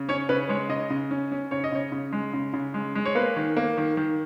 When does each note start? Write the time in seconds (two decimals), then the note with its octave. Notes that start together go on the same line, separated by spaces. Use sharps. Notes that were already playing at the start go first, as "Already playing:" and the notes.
Already playing: C#3
0.09 C#4 C#5
0.29 C#3 B4
0.49 G#3 C#5
0.69 C#3 D#5
0.90 C#3
1.11 C#4
1.32 C#4
1.51 C#3 C#5
1.64 D#5
1.72 C#3 C#5
1.92 C#3
2.13 G#3
2.34 C#3
2.54 C#3
2.74 G#3
2.95 G#3
3.05 C#5
3.15 A#3 B4
3.37 D#3
3.57 A#3
3.78 D#3
3.97 D#3